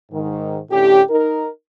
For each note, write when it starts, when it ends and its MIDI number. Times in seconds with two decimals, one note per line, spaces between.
0.12 0.58 44
0.12 0.58 51
0.71 1.01 45
0.71 1.01 50
0.71 1.01 61
0.71 1.01 67
1.10 1.47 63
1.10 1.47 70